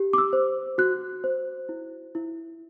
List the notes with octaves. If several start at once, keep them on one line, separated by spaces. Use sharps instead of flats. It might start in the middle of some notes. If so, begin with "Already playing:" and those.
Already playing: G4
D6
E6
C5
F#4 F#6
C5
E4
E4